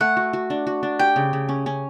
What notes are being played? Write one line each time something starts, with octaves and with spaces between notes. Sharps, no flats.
A3 F#5
F#4
F#4
D4
F#4
D4
G4 G5
C#3
C#3
C#4
C#4